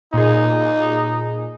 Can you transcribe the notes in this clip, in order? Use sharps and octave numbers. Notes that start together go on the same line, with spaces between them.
A#2 D#4 G#4